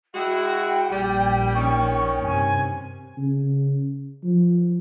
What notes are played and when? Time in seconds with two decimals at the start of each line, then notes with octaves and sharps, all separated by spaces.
0.15 G#3 E4 F#4 G5
0.92 A#1 A#2 G3
1.55 D#3 C#4 C#6
2.24 G2 C3 G#5
3.18 C#3
4.24 F3